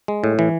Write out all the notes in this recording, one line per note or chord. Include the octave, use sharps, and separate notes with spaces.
G#3
A2
E3